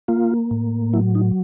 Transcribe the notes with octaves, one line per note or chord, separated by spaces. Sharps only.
A#3 F4
A2
F#3 E4
D#4